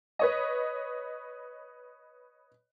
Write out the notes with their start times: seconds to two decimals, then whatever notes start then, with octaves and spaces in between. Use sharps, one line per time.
0.19 B4 C#5 D#5